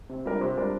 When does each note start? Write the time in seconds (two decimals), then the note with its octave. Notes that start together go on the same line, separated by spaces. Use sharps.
0.10 C3 C4
0.26 G3 D4 F4 A#4
0.41 C3 C5
0.57 G3 D4 A#4